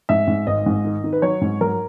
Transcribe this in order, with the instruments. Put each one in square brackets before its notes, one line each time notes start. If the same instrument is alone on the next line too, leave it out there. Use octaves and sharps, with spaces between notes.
[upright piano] G#2 E5
G#2
G#1 D#5
G#2
D#3
D#3
B4
F#3 C#5
G#2
F#3 A#4